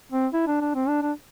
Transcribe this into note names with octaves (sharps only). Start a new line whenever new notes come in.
C4
E4
D4
D4
C4
D4
D4